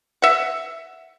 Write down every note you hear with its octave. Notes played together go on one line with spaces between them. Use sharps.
E5 F#5